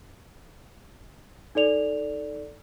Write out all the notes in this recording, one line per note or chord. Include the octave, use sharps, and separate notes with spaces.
D#4 A4 D5 F7